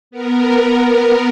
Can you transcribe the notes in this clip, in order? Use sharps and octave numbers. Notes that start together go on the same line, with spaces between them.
B3 A#4